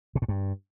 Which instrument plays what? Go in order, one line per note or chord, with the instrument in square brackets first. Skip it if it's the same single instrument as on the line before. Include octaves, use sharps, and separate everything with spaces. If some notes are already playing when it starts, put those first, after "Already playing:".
[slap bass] B2
A2
G2